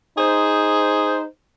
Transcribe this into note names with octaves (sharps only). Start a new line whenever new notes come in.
D#4 G#4 C5